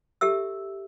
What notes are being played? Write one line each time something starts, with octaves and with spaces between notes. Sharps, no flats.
G4 A4 E5 E6